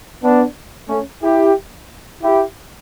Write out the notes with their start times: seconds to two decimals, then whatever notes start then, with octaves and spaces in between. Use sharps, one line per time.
0.23 B3 D4
0.89 A3 C#4
1.23 E4 G4
2.23 E4 G4